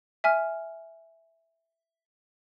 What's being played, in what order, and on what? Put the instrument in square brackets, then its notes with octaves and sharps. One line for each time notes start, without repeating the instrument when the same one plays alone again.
[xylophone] E5 G#5 F6